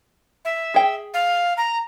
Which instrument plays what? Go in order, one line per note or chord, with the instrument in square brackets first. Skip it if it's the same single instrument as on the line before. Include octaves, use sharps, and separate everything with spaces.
[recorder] E5
[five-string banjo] G#4 G5
[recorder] F5
A#5